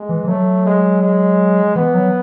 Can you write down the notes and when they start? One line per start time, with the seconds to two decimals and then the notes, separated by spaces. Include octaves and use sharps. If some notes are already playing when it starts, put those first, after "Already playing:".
Already playing: G#3
0.09 E3
0.24 E3
0.27 F#3 A3
0.66 G#3
1.01 G#3
1.75 E3 B3
1.94 F#3